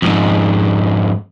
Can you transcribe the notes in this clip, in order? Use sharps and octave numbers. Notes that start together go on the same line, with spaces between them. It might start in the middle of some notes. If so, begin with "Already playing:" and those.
F2 G#2